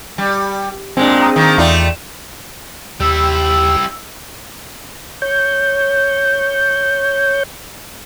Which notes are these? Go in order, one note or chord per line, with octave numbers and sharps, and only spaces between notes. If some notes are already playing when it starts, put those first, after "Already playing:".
G3
A#2 G#3 C4 D4
G5 A#5 D#6
D#3 A#3
E2 A3 D#4 F4 D5 G5
D#2 G3 E4 G4 G5 E6
C#5 G6